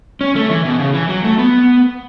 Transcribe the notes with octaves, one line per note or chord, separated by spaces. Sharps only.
C#4
A3
E3
B2
C#3
E3
F#3
A3
B3